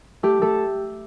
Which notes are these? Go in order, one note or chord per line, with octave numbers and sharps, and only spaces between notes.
A3 G4
A3 A4